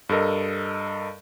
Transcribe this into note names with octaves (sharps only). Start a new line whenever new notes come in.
G2 A4 A#4 D#5